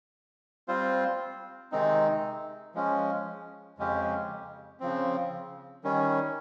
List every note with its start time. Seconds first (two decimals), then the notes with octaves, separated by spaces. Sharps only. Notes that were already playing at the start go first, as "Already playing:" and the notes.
0.68 G3 C4 F4 C5
1.72 C3 D#3 G#3 C4 D#4
2.75 F3 G#3 C#4
3.78 F2 C#3 G#3 C#4 G4
4.80 C#3 F3 C4
5.84 D#3 G3 C#4